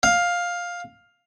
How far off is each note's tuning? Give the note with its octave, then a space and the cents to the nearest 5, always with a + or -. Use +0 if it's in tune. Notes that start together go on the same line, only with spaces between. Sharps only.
F5 +10